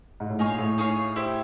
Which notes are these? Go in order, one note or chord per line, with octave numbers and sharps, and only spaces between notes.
G#2
A2
A#2 D#4 G#4 C#5 F5
A2
D#4 G#4 C#5 F5
E4 G4 C5 E5